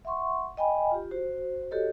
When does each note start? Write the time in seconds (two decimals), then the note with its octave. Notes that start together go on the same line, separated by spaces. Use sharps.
0.05 E5 F#5 C6 C#6
0.57 D#5 G5 G#5 B5
0.91 F4 G4
1.11 F#4 C5
1.71 F#4 G4 A4 C#5 D#5